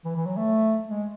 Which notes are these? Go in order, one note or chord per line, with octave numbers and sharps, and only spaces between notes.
E3
E3
F#3
A3
G#3